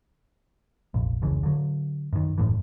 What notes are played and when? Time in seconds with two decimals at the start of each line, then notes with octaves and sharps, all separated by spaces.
0.94 F1 A#1
1.22 F1 C#2 C#3 E3
1.43 D3 F#3
2.13 F#2 D#3
2.38 F1 F#2 A2 E3